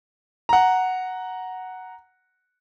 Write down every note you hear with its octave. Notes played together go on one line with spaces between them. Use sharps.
F#5 A#5